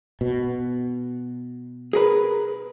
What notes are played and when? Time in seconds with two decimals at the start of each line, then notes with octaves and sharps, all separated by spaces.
0.21 B2
1.93 G#4 A#4 B4